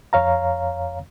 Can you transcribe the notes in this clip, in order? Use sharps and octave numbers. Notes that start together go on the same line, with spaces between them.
F2 C#5 F5 A#5